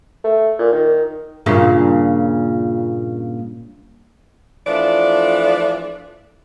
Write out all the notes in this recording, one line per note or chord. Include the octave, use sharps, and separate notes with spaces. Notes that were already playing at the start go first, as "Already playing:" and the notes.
A3
A#2
D#3
G2 A#2 C#3
E3 F3 A3 D4 D5